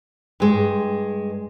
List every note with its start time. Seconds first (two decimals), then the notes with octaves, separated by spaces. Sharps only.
0.40 G2 G#3